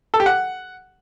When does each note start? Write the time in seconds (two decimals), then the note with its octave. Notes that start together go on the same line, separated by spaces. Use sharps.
0.14 A4
0.20 G4
0.26 F#5